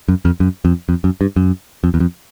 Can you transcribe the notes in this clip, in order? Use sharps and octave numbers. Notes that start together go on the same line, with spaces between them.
F#2
F2
F#2
F2
F2
F#2
G2
F#2
F2
E2
F2